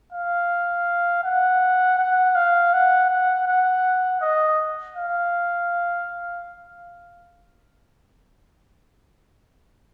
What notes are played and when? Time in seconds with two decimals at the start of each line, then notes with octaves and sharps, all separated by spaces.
0.13 F5
1.24 F#5
1.98 F#5
2.36 F5
2.73 F#5
3.10 F#5
3.47 F#5
4.21 D#5
4.96 F5